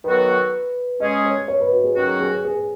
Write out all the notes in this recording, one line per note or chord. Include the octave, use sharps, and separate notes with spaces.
D#3 F#3 B3 F#4 A4 B4
G#3 C#4 G#4 D#5
C#5
C#5
B4
F#4
G#4
D#3 F#3 C#4 F#4 G#4
G#4
G#4